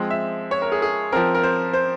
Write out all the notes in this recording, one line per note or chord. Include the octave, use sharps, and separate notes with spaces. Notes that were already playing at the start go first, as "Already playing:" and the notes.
Already playing: F3 G#3 C4
E5
C#5
A#4
G#4
G#4
F3 C4 A#4
A#4
C5
C5